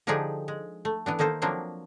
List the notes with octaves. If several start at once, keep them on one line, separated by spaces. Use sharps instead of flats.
D3 F3 D4 D#4 G4 G#4
G#3
A3
E3 B3 D4
D#3 A#3 D#4 A4 C5
F3 F#3 A#3 C4 D4